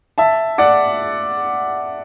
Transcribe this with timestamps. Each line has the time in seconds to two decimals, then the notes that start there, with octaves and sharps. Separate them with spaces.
0.18 E5 A5
0.58 D5 F#5